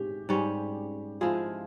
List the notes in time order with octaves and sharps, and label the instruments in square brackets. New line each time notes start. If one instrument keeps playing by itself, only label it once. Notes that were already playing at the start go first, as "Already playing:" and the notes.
Already playing: [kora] G#2 C#4 [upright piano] G4
[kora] G#2 G3 C#4
[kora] F3 G#3 E4 G#4 [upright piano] F4